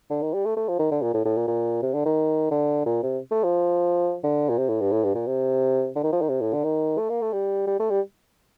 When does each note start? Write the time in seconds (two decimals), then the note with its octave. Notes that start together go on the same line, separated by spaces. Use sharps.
0.10 D3
0.22 D#3
0.34 G3
0.45 A3
0.56 A3
0.68 F3
0.79 D#3
0.91 D3
1.02 A#2
1.14 A2
1.25 A2
1.37 A#2
1.48 A#2
1.82 C3
1.94 D3
2.05 D#3
2.51 D3
2.85 A#2
3.03 C3
3.31 A3
3.44 F3
4.23 D3
4.49 A#2
4.58 C3
4.69 A2
4.81 G2
4.92 A2
5.04 G2
5.15 A#2
5.27 C3
5.95 D3
6.04 D#3
6.12 F3
6.21 D#3
6.29 C3
6.41 A2
6.53 D3
6.64 D#3
6.98 A3
7.10 A#3
7.22 A3
7.33 G3
7.67 G3
7.79 A3
7.90 G3